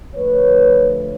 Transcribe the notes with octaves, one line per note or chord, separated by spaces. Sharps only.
D3 F3 A3 B4 C#5